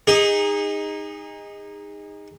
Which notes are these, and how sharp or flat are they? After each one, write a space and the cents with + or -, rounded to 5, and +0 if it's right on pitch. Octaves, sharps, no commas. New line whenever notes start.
D#4 +0 G#4 -30